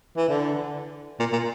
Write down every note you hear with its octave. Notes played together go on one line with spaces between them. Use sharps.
E3
D3
A#2
A#2